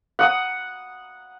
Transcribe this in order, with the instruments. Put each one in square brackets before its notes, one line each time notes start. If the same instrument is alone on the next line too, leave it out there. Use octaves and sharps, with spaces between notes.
[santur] F#5 D#6